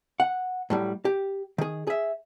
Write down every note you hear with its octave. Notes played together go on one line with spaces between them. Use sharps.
F#5
A2 F#3 G3
G4
D#3 G#4
G#4 E5